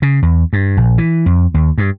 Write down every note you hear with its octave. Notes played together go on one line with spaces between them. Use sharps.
C#3
E2
G2
A#1
E3
F2
D#2
G2